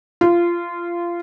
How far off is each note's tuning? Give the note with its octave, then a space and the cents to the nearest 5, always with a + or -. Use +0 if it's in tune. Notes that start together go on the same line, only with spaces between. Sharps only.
F4 -20